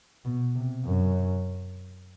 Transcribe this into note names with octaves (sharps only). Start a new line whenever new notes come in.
B2
C3
F#2